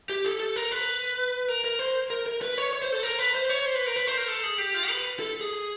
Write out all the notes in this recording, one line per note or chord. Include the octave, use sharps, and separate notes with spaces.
G4
A4
A4
A#4
B4
A#4
A#4
C5
A#4
A#4
B4
C#5
C#5
C5
A4
A#4
B4
C5
C#5
C5
B4
A#4
B4
C5
A#4
A4
G#4
G4
F4
B4
A4
G#4